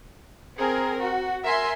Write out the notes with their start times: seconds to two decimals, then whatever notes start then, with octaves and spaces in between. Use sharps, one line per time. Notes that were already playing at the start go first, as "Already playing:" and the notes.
0.57 C4 G#4 A#4
1.02 F#4
1.43 A#4 E5 G#5 C6